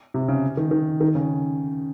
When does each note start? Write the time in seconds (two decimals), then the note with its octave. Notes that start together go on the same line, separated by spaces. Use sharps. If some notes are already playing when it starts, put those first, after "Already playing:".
0.14 C3
0.28 C#3
0.57 D#3
0.71 D#3
1.01 D#3
1.15 C#3